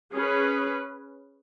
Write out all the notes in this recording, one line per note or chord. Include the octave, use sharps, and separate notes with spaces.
C#4 G#4 B4